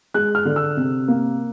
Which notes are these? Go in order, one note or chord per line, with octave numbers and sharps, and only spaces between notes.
G#3 F#6
F6
D3
E6
C3
A#3